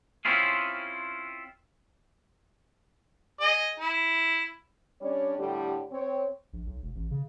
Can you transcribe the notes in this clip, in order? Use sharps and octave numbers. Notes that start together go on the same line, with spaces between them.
C4 C#4 E4 F4 G#4
G#4 D#5
E4
G3 C#4 D4 C#5 D5
A2 D3 G3 G4
C4 C#5
A#1
B1
E1
A1
C#3